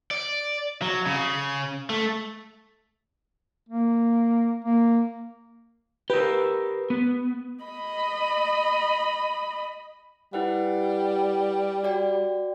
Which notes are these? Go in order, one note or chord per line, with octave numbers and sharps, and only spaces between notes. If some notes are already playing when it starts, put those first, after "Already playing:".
D5
F#3
C#3
A3
A#3
A#3
G4 A#4 B4
B3
D#5 B5
G3 E4 B4 F#5
F#4 D5 G5